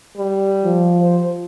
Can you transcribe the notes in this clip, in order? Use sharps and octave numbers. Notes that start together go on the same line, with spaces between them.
G3
F3
C5